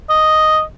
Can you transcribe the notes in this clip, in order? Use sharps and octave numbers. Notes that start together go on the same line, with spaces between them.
D#5